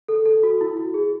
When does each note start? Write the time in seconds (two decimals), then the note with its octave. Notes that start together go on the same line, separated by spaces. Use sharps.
0.08 A4
0.25 A4
0.43 F#4
0.61 E4
0.77 F#4
0.94 G#4